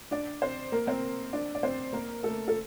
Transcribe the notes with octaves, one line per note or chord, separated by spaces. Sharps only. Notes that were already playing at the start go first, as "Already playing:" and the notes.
D4 D5
C4 C5
A#3 A#4
C4 C5
D4 D5
D5
C4 C5
A#3 A#4
A3 A4
A4